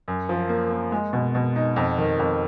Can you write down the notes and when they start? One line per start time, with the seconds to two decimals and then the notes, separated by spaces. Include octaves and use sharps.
0.08 F#2
0.29 F3
0.49 A#3
0.71 A#3
0.92 G#3
1.13 B2
1.35 B2
1.56 D#4
1.76 F2
1.98 D#3
2.19 F2